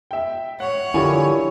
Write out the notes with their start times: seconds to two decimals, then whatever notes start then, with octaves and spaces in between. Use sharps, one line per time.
0.11 E5 G5
0.60 C#5 F#5
0.94 D3 F3 E4 G4 A#4 G#5 C#6